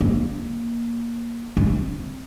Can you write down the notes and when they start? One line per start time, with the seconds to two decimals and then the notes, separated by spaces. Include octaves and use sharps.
0.01 A#3
1.57 C4